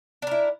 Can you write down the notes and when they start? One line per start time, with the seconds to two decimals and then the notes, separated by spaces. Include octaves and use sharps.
0.22 D4
0.27 A#4
0.31 E4